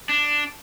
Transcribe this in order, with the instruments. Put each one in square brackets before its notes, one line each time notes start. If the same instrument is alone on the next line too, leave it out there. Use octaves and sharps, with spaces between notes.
[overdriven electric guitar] D4